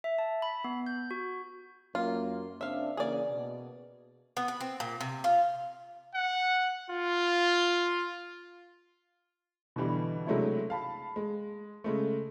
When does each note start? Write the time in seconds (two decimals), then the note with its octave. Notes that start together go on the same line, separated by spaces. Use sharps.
0.04 E5
0.18 A5
0.42 B5
0.64 B3
0.86 G6
1.11 F#4
1.95 F#2 A#3 F4
2.61 C#3 C4 D4 E5 F5
2.97 C#3 E3 A#3 G#4 D5
3.29 B2
4.37 B3
4.48 B4
4.61 C4
4.80 A#2
5.01 C3
5.24 F4
6.14 F#5
6.90 F4
9.76 B2 D3 E3 G3
10.27 C3 F#3 G#3 A3 D4 E4
10.70 F5 A5 B5
11.16 G#3
11.84 C#3 G#3 A3